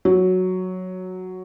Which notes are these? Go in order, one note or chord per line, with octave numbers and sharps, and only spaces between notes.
F#3